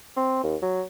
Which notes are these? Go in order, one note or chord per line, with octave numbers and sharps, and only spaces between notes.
C4
D#2
F#3